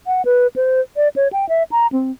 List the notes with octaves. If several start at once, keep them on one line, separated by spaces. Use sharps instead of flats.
F#5
B4
C5
D5
C#5
G5
E5
A#5
C4